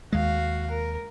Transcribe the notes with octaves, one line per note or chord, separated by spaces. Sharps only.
D#2 G#3 F#4 F5
A#4